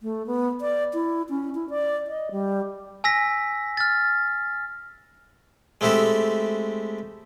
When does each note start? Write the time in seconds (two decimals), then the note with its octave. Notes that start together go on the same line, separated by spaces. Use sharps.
0.01 A3
0.27 B3
0.61 D5
0.94 E4
1.30 C#4
1.55 E4
1.70 D5
2.07 D#5
2.31 G3
3.04 G#5 E6 A#6 B6
3.77 F6 A6
5.81 G#3 A3 C4 E4 G4 A4